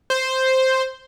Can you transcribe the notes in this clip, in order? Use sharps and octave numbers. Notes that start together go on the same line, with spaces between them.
C5